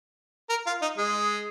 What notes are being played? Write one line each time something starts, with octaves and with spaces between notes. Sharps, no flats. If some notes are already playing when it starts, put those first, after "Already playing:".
A#4
F4
D#4
G#3